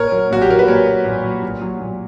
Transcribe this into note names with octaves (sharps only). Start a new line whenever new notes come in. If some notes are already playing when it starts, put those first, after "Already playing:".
Already playing: A#2 A#4 C#5
F#3
A#2 F#4
G4
F#3 A#4
B4
A#2 A#4 C#5
F#3
A#2
F#3
A#2
F#3
A#2